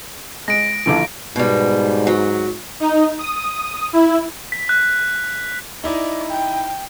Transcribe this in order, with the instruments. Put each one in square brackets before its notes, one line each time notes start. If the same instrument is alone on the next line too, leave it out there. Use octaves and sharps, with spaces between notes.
[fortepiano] G#3 [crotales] A#6 D7
[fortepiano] A#1 D3 E3 [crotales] D7
[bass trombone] G#2 [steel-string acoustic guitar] B2 G3
[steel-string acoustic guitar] F#3
[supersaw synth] D#4
D#6
E4
[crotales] B6
F#6
[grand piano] D#4 E4 D#5 [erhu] D5
[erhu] G5